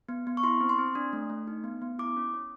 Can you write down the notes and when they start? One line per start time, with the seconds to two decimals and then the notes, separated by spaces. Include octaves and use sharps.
0.09 B3
0.27 B3
0.37 C#6
0.43 E4 C6
0.60 C4
0.69 C6
0.78 C4
0.95 D4
1.13 A3
1.30 A3
1.47 D#4
1.64 B3
1.82 B3
1.99 E4 D6
2.16 C#4
2.34 C#4